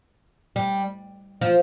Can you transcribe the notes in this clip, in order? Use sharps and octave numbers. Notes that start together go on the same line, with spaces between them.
G3
F3